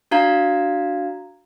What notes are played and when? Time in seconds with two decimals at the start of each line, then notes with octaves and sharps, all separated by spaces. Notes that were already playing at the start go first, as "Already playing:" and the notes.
0.11 D4 F#4 F5 A#5 G#6